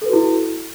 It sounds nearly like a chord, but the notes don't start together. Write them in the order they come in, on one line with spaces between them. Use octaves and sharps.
A4 B4 F#4 E4